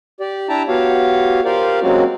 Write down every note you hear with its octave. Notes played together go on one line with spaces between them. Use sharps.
G4 D5
D4 E4 E5 G5 A5 A#5
B3 F#4 G4 C#5 F5
F4 G4 A#4 C5 D5 F5
F#3 G#3 A#3 C4 C#4 F#4